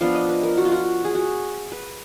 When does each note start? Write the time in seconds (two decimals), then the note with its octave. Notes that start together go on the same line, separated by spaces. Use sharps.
0.01 F3 B3 D4 F5
0.15 D#5
0.29 B4
0.43 A#4
0.58 F#4
0.65 F4
0.72 F#4
1.05 G#4
1.15 F#4
1.72 B4